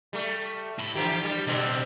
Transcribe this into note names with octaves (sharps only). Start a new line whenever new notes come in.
G3 A3
A2 B5
D3 E3 F3 G4
G3
B2 D3 G3 C4